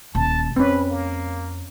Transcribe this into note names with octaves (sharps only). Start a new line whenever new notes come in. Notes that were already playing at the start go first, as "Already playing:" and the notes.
D#1 E4 A5
F2 C4 C#4 B4
A#3